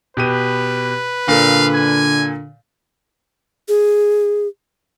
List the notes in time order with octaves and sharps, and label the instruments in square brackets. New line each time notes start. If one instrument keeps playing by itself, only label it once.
[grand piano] B2 G4 D#7 [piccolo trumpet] B4
[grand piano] A#2 A4 [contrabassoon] D3 [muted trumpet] F5
[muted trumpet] G#5
[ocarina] G#4